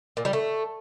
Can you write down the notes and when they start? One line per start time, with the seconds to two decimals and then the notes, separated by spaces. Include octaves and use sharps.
0.17 A#2
0.25 G3
0.33 A3